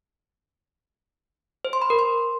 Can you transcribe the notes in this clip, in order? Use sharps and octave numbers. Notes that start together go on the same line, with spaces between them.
C5
C6
B5
A#4
C6